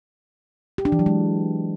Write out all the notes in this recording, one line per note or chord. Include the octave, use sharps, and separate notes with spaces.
G4
D4
E3
F#3
G#3